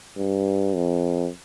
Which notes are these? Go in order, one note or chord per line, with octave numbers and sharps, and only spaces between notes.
G2
F2